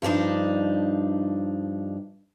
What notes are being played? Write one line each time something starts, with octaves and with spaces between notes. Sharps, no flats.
G2 F3 C4 D4 D#4